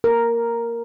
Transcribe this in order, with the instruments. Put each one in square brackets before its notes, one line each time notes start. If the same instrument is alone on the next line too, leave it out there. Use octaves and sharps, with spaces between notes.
[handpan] A#4